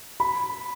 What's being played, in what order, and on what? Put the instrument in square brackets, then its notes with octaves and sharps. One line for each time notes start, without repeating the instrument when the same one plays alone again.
[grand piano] B5